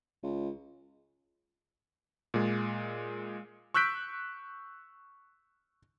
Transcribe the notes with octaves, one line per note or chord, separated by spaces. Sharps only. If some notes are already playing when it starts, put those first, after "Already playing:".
C#2
A#2 G#3
C#6 E6 F#6 G6 B6 D7